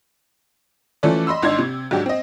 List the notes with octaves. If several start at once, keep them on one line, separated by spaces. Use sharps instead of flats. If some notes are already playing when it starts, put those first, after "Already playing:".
E3 F3 A3 C#4 A4 D5
D#5 B5 C6 E6
G#1 D4 D#4 C6 G#6
C3
G#2 F#3 D4 G4
C4 D#5